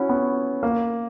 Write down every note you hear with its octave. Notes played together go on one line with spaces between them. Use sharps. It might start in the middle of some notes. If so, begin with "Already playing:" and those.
Already playing: C#4 E4 F#4
B3
A#3